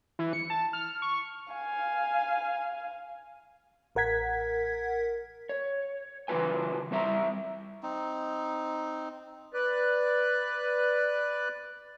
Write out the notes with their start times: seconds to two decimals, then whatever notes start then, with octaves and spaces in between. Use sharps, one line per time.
0.19 E3
0.33 C#7
0.50 A5
0.73 F6
1.02 C#6
1.52 F5 G#5
3.95 A1 A#4 F#5 G#6 B6
5.49 C#5
6.28 C#3 E3 F#3 F4 B4 G#5
6.91 G3 C4 E5 A#5
7.83 C4 D#4
9.54 B4 D5 F#6